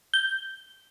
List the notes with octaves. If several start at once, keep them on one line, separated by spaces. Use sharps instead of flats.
G6